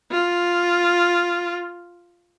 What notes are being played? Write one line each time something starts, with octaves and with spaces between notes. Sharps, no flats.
F4